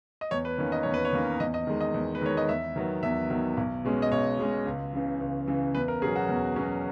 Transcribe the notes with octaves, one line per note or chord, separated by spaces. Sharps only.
D#5
E2 C#5
B4
D#3 A#3 C#4
D#5
E2 C#5
B4
C#5
D#3 A#3 C#4
E2 D#5
D#5
D#3 G#3
D#5
E2
B4
D#3 G#3 C#5
D#5
E2 E5
D#3 F#3 B3
E2 E5
D#3 F#3 B3
B1
B2 G#3 C#4
D#5
B1 C#5
B2 G#3 C#4
C#2
C#3 E3
C#2
C#3 E3
E2 B4
A#4
B2 F#3 C#4 G#4
F#4
E2
B2 F#3 C#4